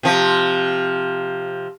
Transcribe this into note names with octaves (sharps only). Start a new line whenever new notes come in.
C3 F3